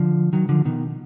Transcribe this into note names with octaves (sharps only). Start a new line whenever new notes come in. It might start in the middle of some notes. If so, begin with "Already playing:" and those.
Already playing: D3 F3
D#3 F#3
D3 F3
B2 D#3